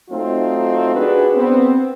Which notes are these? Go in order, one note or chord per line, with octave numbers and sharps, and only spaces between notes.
F#3 A3 C4 D#4 F4
D4 F#4 G#4 B4
B3 C4